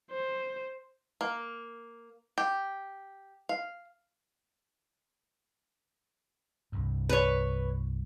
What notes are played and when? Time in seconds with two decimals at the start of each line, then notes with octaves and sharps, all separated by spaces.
0.11 C5
1.21 A#3
2.38 G4
3.49 F5
6.72 C2 G2
7.09 B4 C#5